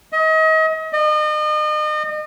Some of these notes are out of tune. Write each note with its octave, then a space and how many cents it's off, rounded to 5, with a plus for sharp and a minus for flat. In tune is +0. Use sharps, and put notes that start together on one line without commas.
D#5 +35
D#5 -35